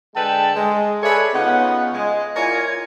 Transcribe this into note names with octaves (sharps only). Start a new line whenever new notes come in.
D3 G#3 A4 B4 G5 A5
G#3
G#4 A4 B4 C#5 D5 E5
C#3 B3 C#4 D#4 F4 F#5
G#3
E4 F4 A#4 C#5 D5 G#5